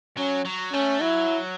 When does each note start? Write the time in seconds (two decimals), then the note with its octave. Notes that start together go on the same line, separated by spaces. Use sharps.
0.17 F#3 C#4
0.45 F#3
0.73 A3 C#4
1.01 F#3 E4